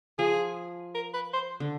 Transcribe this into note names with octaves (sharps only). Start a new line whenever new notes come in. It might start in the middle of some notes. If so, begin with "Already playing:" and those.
F3 G#4
A#4
B4
C5
D3